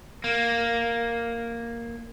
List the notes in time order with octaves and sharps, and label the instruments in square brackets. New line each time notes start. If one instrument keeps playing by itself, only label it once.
[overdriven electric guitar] A#3